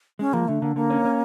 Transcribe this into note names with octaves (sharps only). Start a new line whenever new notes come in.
G#3 C#4
F3 A#3
D3 A3
D3 A#3
D3 A#3
C#4
C#4